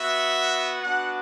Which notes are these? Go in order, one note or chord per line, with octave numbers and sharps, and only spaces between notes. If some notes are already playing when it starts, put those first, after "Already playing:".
Already playing: B3 F#4 E5
B3 D4 F#4 F#5